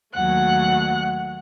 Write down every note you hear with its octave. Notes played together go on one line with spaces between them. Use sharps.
D#2 F#3 A3 F#5 F#6